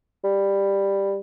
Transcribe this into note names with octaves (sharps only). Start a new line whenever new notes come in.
G3